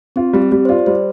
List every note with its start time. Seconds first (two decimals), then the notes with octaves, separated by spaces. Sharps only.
0.16 C4 F4
0.33 G3 C4
0.51 G3 G4
0.65 C5
0.69 F4 D5
0.86 G3 C5